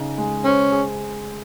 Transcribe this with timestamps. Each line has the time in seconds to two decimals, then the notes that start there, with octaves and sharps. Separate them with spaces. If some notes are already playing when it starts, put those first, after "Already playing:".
Already playing: C#3 D#4 G#4
0.18 G#3
0.45 C#4 C5
0.72 G#4